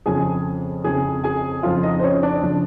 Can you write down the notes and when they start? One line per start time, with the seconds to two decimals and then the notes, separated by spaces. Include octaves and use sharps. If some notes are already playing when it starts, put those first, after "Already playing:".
0.06 F2 C#3 F3 G#4 G#5
0.84 F2 C#3 F3 G#4 G#5
1.24 G#4 G#5
1.63 F2 C#3 F3 F4 F5
1.83 D#4 D#5
1.99 C5
2.03 C#4 C#5
2.23 D4 D5
2.42 C#3 F3